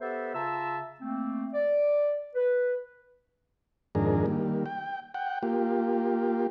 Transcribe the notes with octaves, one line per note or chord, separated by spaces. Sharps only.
B3 G4 A4 B4 C5 E5
C#3 F4 E5 A5 A#5 E6
A3 A#3 C4
D5
B4
F2 G#2 D#3 D4 G#4 A#4
D#3 G3 A#3
G5
F#5 G5
A#3 F4 G4